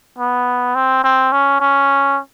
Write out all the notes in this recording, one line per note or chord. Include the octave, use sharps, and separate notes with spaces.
B3
C4
C4
C#4
C#4